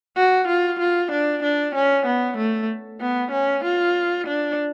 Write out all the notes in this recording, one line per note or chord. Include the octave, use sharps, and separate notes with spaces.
F#4
F4
F4
D4
D4
C#4
B3
A3
B3
C#4
F4
D4